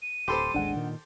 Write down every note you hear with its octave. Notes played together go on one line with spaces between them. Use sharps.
D#7
D1 G4 A4 C5 B5 C6 D6
A1 D#2 G#3 D4 F#5
A#2 D#3